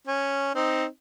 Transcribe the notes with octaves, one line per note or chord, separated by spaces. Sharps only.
C#4
C4 D#4